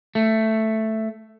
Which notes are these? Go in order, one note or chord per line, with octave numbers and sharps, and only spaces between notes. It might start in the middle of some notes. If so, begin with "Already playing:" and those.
A3